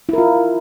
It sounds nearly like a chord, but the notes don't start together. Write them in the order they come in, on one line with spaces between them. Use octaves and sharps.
E4 A#4 F4